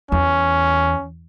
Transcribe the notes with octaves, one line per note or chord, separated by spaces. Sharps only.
E2 C#4